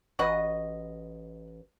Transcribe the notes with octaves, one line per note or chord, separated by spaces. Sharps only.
A1 F#4 B4 D#5